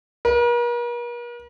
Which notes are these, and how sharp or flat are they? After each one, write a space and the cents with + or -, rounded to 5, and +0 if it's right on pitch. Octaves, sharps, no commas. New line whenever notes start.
A#4 +45